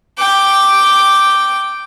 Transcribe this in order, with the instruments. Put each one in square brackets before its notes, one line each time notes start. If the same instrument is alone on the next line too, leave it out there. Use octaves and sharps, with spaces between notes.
[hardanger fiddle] G5 D6